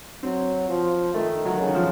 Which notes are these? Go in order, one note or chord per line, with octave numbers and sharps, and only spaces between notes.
F#3 C4
F3
D#3 A3
F#3
C#3
D#3
F3